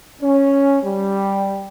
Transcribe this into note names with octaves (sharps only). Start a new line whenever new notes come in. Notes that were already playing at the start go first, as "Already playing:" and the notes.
C#4
G3